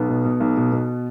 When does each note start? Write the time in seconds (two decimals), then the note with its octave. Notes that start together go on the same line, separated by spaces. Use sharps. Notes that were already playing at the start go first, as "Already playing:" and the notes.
Already playing: B1 B3
0.09 B2
0.25 B2
0.40 B1
0.57 B2
0.72 B2